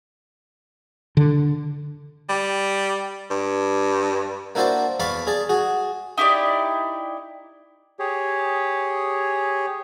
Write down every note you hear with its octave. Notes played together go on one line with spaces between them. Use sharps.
D3
G3
G2
A#3 D4 E4 F#4 C5 D5
E2 F5 A5 B5 C#6 D6
G#4 D5 A5
F#4 G#4
D#4 E4 G4 D5
G4 G#4 C#5